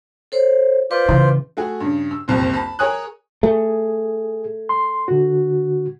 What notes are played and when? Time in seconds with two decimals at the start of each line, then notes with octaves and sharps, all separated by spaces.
0.32 A4 C5 C#5
0.91 F4 B4 C5 D5
1.09 C#3 E3
1.57 A3 F#4 G#4
1.80 G2 C#3
2.11 E6
2.28 F#1 C2 F2
2.54 A5 B5
2.79 G#4 A#4 C#5 G#5 D#6 F#6
3.43 A3 G#4
4.69 C6
5.08 D3 F#4